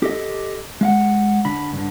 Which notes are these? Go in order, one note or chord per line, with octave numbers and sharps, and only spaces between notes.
G4 A4 D#5
G#3 F5 F#5
D3 B5
G2 D3